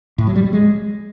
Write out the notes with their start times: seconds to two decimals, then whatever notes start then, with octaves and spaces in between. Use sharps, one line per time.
0.18 A2
0.27 F#3
0.36 G3
0.44 F#3
0.53 G#3